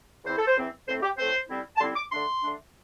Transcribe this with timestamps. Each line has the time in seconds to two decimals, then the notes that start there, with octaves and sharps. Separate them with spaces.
0.24 E2 E3 C4 E4 C5
0.36 A4
0.46 C5
0.55 E2 E3 C4 E4
0.86 A2 A3 C4 C5
1.02 G4
1.17 A2 A3 C4 C5
1.48 D3 G3 C4 E4
1.76 A5
1.80 D3 G3 C4 E4 C6
1.95 D6
2.11 D3 A3 D4 C6
2.42 D3 A3 D4